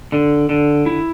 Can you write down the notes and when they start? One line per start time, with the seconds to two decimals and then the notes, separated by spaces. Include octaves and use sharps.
0.12 D3
0.49 D3
0.86 E4